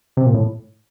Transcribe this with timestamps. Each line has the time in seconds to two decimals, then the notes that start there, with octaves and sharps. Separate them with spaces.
0.17 C3
0.26 A#2
0.34 A2